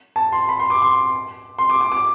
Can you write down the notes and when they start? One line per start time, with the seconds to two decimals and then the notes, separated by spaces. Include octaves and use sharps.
0.16 A5
0.32 C6
0.49 B5
0.60 C6
0.70 D6
0.82 C6
1.59 C6
1.70 D6
1.81 D6
1.92 D6